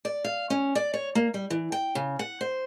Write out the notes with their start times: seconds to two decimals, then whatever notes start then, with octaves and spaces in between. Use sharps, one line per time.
0.05 D5
0.24 F5
0.50 C#4
0.75 D5
0.94 C#5
1.15 A#3
1.34 G3
1.50 E3
1.72 G5
1.95 C#3
2.19 F#5
2.41 C5